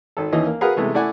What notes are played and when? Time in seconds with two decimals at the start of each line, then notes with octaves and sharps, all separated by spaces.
0.17 G#1 A4
0.33 D#2 E3 C#4 D#5
0.46 A#3
0.61 F#4 G#4 A#4 B4 F5 F#5
0.76 C3 E3 G#3 A3 B3
0.94 A3 E4 D5 F#5 G#5